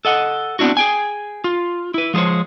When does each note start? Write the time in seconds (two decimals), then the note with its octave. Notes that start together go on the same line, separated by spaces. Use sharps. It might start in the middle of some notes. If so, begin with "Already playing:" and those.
0.05 A4 D#5 F#5
0.59 B3 C4 D4 E4 F#4
0.77 G#4 G5 G#5
1.44 F4
1.94 E4 B4
2.14 F3 G#3 A4 C5 C#5